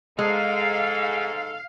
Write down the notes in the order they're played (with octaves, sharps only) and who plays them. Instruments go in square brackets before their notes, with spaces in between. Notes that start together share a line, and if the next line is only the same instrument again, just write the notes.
[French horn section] G#2 [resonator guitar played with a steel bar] G#3 [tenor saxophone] A4 [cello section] F5